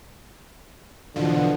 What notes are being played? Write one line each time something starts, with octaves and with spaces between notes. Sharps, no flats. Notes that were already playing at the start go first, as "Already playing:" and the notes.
E2 B2 D3 F3